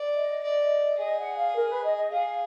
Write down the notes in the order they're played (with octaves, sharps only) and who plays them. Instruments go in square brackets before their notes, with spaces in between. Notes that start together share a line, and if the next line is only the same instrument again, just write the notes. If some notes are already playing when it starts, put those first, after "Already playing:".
Already playing: [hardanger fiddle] D5
[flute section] D#5
[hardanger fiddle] D5
[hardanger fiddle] G#4 [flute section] D#5
[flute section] F#5
F5
A#4
B4
D#5
D#5
[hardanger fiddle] G#4 [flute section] F5